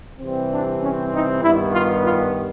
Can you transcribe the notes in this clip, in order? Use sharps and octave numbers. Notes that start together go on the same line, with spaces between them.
C3 E3 G3 C4
D4
C#4
D#4
G2 D#3 G3 B3 E4
F4
F4